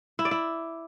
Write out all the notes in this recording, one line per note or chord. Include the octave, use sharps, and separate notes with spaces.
E4
D5
E4